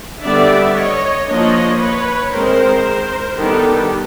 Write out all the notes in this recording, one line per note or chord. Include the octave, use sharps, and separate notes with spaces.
D3 G3 B3 D4 D5 E5
C#5 D#5
F3 A#3 D4 C#5 D#5
B4 C#5
D#3 G#3 C4 A#4 C5
D#3 G3 B3 D4 G4 A4